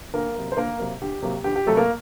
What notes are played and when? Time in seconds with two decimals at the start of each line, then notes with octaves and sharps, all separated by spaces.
0.14 D2 A#3 A#4
0.36 C3 F#3 A#3
0.52 C5
0.57 D2 A#3 A#4
0.80 C3 F#3 A#3
1.02 D2 G4
1.22 C3 F#3 A#3
1.44 D2 G4
1.56 G4
1.66 C3 F#3 A3 A#3 A4
1.77 A#3 A#4